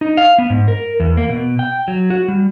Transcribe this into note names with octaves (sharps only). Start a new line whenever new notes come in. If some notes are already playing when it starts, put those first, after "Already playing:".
D#4
F5
B3
G#2
A#4
E2
A#3
B2
G5
F#3
F#4
G3